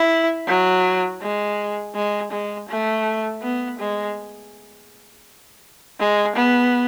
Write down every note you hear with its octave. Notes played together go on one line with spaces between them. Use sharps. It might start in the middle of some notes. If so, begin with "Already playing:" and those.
Already playing: E4
F#3
G#3
G#3
G#3
A3
B3
G#3
G#3
B3